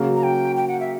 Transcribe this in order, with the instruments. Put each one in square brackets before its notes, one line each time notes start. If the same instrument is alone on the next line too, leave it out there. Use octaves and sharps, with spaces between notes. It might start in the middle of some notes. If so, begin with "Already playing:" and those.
Already playing: [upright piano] C#3 F#3 A#3
[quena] A#5
G5
G5
F#5
E5